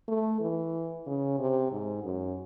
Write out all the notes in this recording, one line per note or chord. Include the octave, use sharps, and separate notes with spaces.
A3
E3
C#3
C3
G#2
F#2